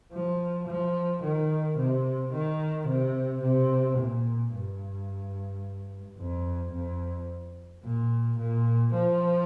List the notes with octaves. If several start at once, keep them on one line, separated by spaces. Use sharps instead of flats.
F3
F3
D#3
C3
D#3
C3
C3
A#2
G2
F2
F2
A#2
A#2
F3